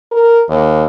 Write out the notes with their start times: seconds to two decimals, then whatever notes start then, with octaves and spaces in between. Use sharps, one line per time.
0.11 A#4
0.48 D#2